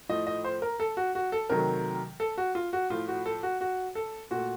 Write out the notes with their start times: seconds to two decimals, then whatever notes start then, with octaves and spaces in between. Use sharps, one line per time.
0.09 A2 F3 A3 D#5
0.27 D#5
0.44 C5
0.62 A#4
0.80 A4
0.97 F#4
1.15 F#4
1.32 A4
1.50 C3 D#3 F#3 A3 A#4
2.20 A4
2.38 F#4
2.55 F4
2.73 F#4
2.90 A2 F3 A3 F4
3.08 F#4
3.26 A4
3.43 F#4
3.61 F#4
3.95 A4
4.31 A#2 A3 F#4